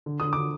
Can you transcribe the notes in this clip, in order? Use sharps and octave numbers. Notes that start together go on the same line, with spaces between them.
D3
D3 D#6
D3 D6